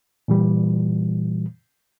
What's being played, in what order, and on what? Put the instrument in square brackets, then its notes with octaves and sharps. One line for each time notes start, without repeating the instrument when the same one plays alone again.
[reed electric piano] A#2 E3 G3